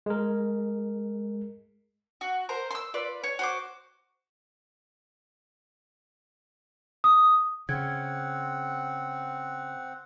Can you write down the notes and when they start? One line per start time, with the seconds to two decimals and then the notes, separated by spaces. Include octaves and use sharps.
0.06 G#3 A#4
2.21 F#4
2.49 A#4 C5 A#5
2.71 C6 E6
2.94 F4 B4 D5
3.24 C#5
3.39 F#4 C5 D6
7.04 D#6
7.69 C#3 C4 F#5 G#6